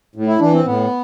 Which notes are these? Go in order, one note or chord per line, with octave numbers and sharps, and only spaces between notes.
A2
E4
E3 D4
C4
A2 B3